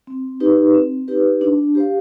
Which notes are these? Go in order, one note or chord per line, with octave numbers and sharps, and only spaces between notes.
C4
D#4 G4 B4
C4
D#4 G4 B4
D4
G4 C5 F5